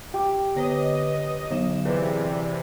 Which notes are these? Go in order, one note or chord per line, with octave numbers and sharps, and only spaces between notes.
G4
D3 B4 C#5 D#5
D3 F#3 E7
C3 E3 G#4 B4 D5